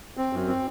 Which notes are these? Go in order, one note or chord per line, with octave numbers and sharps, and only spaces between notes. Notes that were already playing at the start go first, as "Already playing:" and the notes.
C4
F#2
C4